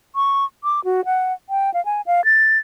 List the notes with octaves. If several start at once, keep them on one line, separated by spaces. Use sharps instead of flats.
C#6
D6
F#4
F#5
G5
F5
G#5
F5
A6